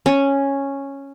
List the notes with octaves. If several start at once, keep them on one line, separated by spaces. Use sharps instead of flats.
C#4